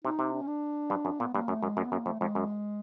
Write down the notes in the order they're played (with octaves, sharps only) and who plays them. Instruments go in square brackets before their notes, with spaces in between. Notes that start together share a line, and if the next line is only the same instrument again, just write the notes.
[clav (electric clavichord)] C3 [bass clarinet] D#4
[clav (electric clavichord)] C3
[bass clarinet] D4
C#4
D4
[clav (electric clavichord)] G2
F#2
[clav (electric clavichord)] A#2 [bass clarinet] B3
[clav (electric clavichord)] G2 [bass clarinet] A#3
[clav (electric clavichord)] F#2 [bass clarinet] A3
[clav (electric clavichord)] F#2 [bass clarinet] G#3
[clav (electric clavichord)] F#2 [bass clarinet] A3
[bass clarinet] B3
[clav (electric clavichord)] F#2 [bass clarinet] A#3
[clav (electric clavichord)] F2 [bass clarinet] A3
[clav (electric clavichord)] F2 [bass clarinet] G#3
[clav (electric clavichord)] F#2